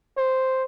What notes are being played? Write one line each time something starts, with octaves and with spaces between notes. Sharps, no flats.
C5